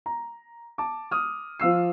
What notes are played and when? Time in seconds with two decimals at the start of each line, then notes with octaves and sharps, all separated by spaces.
0.06 A#5
0.78 A5 D6
1.11 D#6 F6
1.60 F3 F5 E6 C7